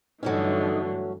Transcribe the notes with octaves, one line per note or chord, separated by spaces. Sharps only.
G2 D3 E3 F#3 A3 C#4 D#4